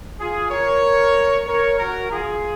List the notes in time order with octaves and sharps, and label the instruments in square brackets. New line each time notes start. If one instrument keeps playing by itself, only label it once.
[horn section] F4 G#4
A#4 C#5
A#4 C#5
F#4 A#4
F4 G#4